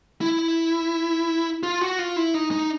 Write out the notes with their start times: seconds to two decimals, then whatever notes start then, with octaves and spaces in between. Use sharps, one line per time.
0.21 E4
1.63 F4
1.81 F#4
1.99 F4
2.16 E4
2.34 D#4
2.51 D#4